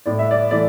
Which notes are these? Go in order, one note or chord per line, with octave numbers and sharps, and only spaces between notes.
A2 D5
E5
D5
E3 A3 D5